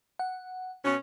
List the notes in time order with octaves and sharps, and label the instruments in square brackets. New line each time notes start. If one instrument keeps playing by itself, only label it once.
[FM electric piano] F#5
[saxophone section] B2 C#4